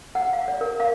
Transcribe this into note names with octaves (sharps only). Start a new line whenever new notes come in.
F#5
F5
D5
A#4
F5